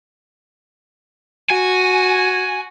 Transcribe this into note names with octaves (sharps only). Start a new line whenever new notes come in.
F#4 G#5